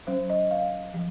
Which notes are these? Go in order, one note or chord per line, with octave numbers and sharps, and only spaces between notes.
F#3 C#4 C5
D#5
F5
F3